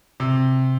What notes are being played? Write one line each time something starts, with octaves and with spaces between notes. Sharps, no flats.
C3